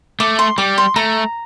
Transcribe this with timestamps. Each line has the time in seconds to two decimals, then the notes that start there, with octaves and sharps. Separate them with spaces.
0.20 A3 D6
0.39 C6
0.58 G3 D6
0.78 C6
0.96 A3 A#5